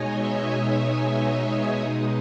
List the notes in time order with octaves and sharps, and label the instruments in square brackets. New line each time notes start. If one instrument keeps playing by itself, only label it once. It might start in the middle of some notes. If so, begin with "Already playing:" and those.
Already playing: [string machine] B2 G#3 D#4 C#5 D#5 G#5
E5
D#5
E5
B2 G#3 D#4 D#5